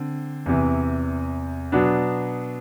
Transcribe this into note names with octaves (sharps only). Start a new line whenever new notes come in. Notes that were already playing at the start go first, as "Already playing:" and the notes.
Already playing: D3 C4
E2 C3 E3
B2 F#3 B3 D4